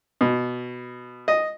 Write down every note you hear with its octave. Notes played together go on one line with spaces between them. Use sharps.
B2
D#5